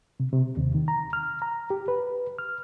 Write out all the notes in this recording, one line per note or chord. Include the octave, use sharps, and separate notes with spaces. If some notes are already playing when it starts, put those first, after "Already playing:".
C3
C3
D#2
D#3
A#5
F6
A#5
G4
B4
F6